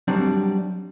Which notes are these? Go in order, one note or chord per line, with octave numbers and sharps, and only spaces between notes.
F#3 G3 C4 D4